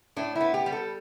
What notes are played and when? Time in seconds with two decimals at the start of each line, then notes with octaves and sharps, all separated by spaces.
0.16 A2 D4
0.36 E4
0.41 B3
0.54 G4
0.66 G3
0.72 A4